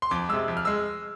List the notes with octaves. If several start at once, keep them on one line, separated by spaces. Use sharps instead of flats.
C6
F2 D6
C3 G#3 E6
F2
F6
G#3 E6